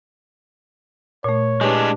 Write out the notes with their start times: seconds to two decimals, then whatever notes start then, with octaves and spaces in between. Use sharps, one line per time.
1.24 A#2 A3 C#5
1.61 G#3 D4 G4 B4